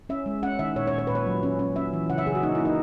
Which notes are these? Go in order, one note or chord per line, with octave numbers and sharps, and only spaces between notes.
C#4 E5
G#3
C#4 F#5
D#3 E5
A#2 C#5
C#5
A#2
C#5
A#2 B4
C#5
F#3
C#4
C#4
C#4 E5
E3
C#3 F#5
E5
C#3 G#4
F#4
A#3 D#4
A#3 E4
D#4